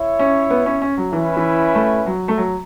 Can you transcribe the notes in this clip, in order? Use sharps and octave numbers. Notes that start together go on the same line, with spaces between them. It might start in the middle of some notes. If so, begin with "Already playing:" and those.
Already playing: E4 C#5 E5
C#4
B3
C#4
C#4
F#3
E3 C#4 E4 B4 E5
E3
A3
F#3
A3
F#3